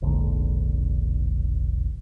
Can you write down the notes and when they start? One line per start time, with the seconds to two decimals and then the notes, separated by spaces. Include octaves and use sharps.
0.02 E1 A#1 G#2 D3